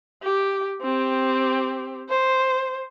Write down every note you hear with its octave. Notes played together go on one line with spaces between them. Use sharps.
G4
C4 G4
C5